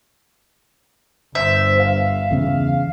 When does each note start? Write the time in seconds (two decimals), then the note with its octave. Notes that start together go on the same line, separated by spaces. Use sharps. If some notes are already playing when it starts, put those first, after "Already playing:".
1.35 G1 C5 E5
1.79 F5
2.31 E2 C#3